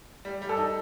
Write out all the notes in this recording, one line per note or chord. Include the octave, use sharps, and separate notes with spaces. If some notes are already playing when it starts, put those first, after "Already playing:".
G3
G3
A4
D#4